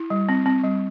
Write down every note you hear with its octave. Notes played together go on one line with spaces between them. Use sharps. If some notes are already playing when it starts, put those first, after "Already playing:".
Already playing: E4
G3
C4
C4
G3